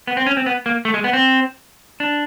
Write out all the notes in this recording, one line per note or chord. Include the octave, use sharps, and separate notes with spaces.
B3
C4
C#4
C4
B3
A#3
A3
G#3
B3
C4
D4